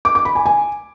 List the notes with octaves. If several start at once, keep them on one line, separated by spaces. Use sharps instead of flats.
D6
D6
B5
G#5
G#5